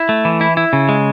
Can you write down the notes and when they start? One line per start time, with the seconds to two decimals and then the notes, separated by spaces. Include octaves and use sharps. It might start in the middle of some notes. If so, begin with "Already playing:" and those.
Already playing: E4
0.09 A3
0.25 E3
0.41 E4
0.57 E4
0.73 C#3
0.89 G#3